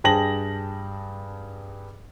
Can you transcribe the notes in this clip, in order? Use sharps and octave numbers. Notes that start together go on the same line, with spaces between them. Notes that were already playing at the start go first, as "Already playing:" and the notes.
G2 G#4 G5 A5 A#6 F#7